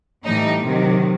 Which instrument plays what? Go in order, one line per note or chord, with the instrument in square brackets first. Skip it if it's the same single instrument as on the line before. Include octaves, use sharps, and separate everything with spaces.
[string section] A2 E3 G3 D#4
C3 D#3 F#3